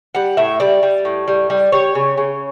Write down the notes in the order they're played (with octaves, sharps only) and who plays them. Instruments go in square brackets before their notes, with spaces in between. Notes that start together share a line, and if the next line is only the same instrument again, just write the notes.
[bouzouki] G3 F#5
A2 E5
G3 D5
G3
A2
G3
G3
G3 C#5
C#3
C#3